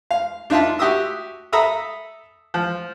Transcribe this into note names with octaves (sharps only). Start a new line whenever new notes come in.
F5
D4 D#4 F4 E5 A5
F#4 G4 E5 D#6 E6
A4 E5 A#5 B5 D#6 E6
F3